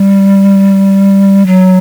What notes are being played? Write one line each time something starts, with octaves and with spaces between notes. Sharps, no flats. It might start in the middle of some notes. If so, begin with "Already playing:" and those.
Already playing: G3
F#3